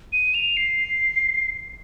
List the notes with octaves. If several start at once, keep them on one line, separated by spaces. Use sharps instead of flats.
D#7
F7
C7